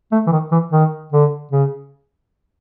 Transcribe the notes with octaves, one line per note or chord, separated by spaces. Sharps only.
A3
E3
D#3
E3
D#3
D3
C#3